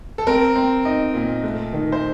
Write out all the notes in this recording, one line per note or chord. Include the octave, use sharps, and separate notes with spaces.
A4
C4 A#4
C4
D#4 D#5
A#2
A3
D#3
C5